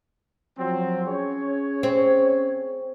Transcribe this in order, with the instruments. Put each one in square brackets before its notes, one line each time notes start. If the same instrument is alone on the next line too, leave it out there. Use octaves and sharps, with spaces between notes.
[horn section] F3 F#3 C4
C#4 G#4 C#5
[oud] C4